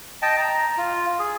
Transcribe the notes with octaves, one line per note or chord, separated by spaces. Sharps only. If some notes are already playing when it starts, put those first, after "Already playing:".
D#5 G5 A5
A#5
F4
G#4